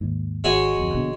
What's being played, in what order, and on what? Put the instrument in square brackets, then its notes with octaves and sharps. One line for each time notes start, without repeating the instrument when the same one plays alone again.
[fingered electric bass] D#2 G#2
[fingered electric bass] G#1 [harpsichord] G#3 F#4 C#5
[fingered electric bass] D1 F2
A#1 B2 D3